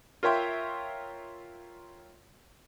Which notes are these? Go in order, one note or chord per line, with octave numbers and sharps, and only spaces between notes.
F4 A#4 C#5 E5 G5 C6